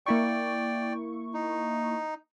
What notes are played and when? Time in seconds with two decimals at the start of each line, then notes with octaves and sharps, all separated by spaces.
0.06 A#3 E4 D5 G5 C#6
1.34 D#4